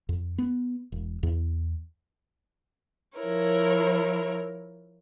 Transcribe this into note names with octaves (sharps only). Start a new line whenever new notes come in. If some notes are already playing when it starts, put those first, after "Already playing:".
F2
B3
E1
E2
F3 E4 A#4 C#5